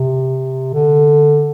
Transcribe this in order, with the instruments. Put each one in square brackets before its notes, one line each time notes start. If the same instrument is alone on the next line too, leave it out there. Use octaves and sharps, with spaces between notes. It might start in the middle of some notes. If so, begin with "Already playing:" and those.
Already playing: [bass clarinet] C3
D3